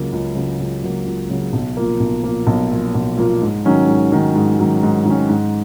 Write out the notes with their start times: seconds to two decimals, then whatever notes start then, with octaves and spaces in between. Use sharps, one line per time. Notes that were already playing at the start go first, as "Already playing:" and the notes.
Already playing: C#2 C#3 F#3 A#3
0.12 C#2
0.35 C#3 F#3 A#3
0.60 C#2
0.83 C#3 F#3 A#3
1.06 C#2
1.29 C#3 F#3 A#3
1.53 B1
1.77 A#2 F3 A#3
2.00 B1
2.24 A#2 F3 A#3
2.47 B1
2.71 A#2 F3 A#3
2.95 B1
3.17 A#2 F3 A#3
3.42 G#2
3.65 D#3 F#3 C#4
3.88 G#2
4.12 D#3 F#3 C#4
4.35 G#2
4.59 D#3 F#3 C#4
4.83 G#2
5.05 D#3 F#3 C#4
5.29 G#2